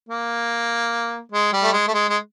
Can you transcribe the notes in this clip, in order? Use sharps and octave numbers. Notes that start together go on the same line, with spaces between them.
A#3
G#3
G3
A3
G#3
A3
G#3
G#3